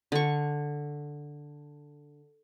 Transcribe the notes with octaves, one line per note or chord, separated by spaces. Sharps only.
D3 C#6